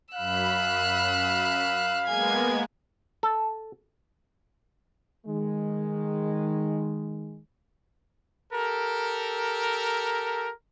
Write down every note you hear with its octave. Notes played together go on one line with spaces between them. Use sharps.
F#2 F5 B5 E6 F#6
G#3 A#3 B3 G#5 G#6
A4
D#3 G#3
G4 A4 A#4